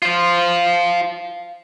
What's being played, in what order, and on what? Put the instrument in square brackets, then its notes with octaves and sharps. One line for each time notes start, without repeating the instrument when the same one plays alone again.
[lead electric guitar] F4 C5